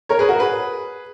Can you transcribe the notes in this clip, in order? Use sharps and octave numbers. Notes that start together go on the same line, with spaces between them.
A#4 C#5
G#4 B4
F#4 A#4
G#4 B4